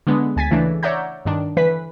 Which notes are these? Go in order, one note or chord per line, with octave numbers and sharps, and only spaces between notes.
D3 G#3 B3 D4
D2 G#5 A6 B6
C#3 E3 A3 D4
C#5 D5 E5 F#5 A#5 G6
G2 D#3 D4
D3 E3 B4 B6